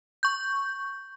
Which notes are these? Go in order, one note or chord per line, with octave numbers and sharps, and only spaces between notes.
C#6 G6